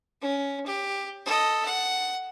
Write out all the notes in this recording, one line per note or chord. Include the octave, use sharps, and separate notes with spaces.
C#4
G4
A4 D#5
F#5